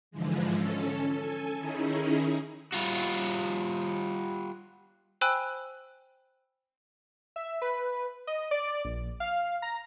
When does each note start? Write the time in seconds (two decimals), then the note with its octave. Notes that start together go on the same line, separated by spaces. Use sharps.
0.11 G#2 D3 E3 F3 G#3
0.52 C#4 A4
1.11 A4 G#5
1.58 D#3 C#4 D#4 E4 G#4
2.72 G3 F4 F#4
5.21 C5 G5 G#5 B5 E6 F#6
7.36 E5
7.62 B4
8.27 D#5
8.51 D5
8.85 A#1
9.20 F5
9.62 A#5